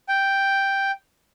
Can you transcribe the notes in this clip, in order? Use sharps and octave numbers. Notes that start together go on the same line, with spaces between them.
G5